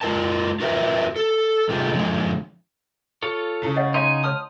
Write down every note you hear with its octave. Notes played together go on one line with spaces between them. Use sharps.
G#3 F4 A#4 A5
F4 F#4 A#4 B4 E5
A4
C3 G3 A3 F4 G#4
D3 F3 G3 G#3
F4 A4 C#5
C#3 E4
C#5 D#5 F#5
D#4 C#5 F5 G#5 C6
C#5 A5 D#6 F6